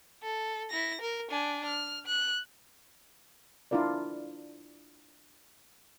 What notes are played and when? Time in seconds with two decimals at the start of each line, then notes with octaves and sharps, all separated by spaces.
0.23 A4
0.70 E4 A#6
1.01 A#4
1.31 D4 G#5
1.65 F6
2.06 F#6
3.71 D4 E4 F4 A#4 D5